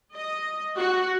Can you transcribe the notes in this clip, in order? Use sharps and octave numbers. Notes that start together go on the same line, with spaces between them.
D#5
F#4